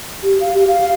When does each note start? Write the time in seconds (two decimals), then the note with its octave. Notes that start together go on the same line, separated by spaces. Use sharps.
0.23 G4
0.41 F5
0.54 G4
0.67 F5
0.81 F5